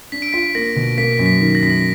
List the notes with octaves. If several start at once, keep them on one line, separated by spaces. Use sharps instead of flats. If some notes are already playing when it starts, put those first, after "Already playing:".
D4 B6
D7
F4 B6
A#3 A#6
B2
A#3 B6
F#2
B6
D#3
A#6
F#2 B6
A#6